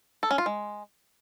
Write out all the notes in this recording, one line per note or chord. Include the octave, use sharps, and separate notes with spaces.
A4
C#4
F4
G#3